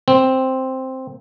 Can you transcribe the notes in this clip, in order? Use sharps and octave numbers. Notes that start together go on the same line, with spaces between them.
C4